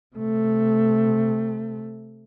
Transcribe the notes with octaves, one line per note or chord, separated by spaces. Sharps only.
C3 A3